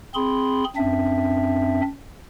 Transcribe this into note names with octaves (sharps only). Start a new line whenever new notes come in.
C4 G#4 B5 C6
F#2 C4 D4 E5